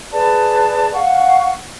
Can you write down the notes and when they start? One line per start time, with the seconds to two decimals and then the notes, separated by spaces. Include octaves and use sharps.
0.12 G#4 B4 D5 A5
0.93 F5 F#5 C#6